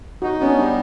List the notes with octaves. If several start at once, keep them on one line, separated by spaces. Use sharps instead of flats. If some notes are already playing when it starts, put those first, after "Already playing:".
D#4 F#4
B3 C#4
D4
G3